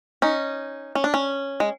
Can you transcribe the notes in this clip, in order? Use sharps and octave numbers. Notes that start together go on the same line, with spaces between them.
C#4 D#4
C#4
D4
C#4
G#3